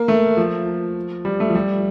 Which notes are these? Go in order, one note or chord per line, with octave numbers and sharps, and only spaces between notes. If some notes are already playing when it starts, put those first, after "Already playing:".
Already playing: A#3
A3
F3
G3
A3
F3
G3